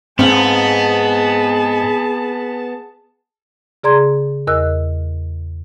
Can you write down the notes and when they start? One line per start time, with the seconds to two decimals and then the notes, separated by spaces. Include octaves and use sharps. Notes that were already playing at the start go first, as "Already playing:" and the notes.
0.19 G#2 B3 C4 G#4 F5 A5
3.84 C#3 G#4 D5 A#5 C6 G#6
4.47 E2 A#4 D#5 E6 F#6